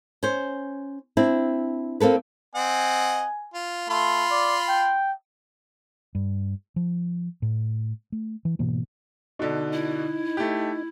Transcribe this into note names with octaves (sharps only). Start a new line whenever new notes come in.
C#4 C5
C4 D4 E4
A#3 C4 A4 B4
C4 D#5 F#5 G#5
F4
A3 F4 B5 C6
D5
G5
G2
F3
A2
A3
E3
G#2 B2 E3 A#3
B2 D3 D#4
E4
A3 G4